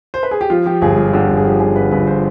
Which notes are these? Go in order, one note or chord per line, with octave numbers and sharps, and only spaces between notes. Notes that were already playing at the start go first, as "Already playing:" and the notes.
C5
B4
G#4
G4
F3 F4
F3 G4
G1 G#4
G2 G4
D3 G4
G1 F4
G#4
F3 G4
D3 G#4
D3 B4
G1 B4
C5